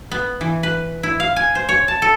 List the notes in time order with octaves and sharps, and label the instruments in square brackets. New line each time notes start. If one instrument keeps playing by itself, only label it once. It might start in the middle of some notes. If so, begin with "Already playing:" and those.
[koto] B3
E3
B4
E4
F5
G#5
C5
C#5
A5
A4